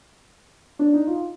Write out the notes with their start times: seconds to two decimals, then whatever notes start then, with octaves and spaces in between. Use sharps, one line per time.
0.79 D4
0.93 D#4
1.07 F4